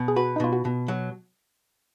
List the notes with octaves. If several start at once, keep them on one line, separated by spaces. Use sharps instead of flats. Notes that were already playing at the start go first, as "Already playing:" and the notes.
Already playing: B2
G#4
F#4 B4
D#4
B2 F4
F#4
B2
F#3